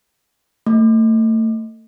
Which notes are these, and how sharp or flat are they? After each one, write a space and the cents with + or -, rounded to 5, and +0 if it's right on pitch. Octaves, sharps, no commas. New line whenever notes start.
A3 +30